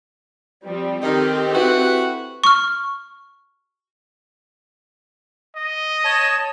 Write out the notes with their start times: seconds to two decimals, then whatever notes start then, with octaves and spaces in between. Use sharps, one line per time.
0.64 F3 G3 C4
1.03 D#3 C4 D#4 G4 A4
1.53 E4 F#4 B4
2.44 C#6 F6
5.56 D#5
6.05 C#5 A5